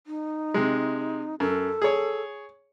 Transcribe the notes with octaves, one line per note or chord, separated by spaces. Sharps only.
D#4
C3 G#3
F#2 A4
G#4 C#5